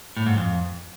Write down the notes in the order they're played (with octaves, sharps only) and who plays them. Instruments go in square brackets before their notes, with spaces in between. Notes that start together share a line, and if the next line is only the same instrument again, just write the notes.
[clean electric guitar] A2
G#2
F2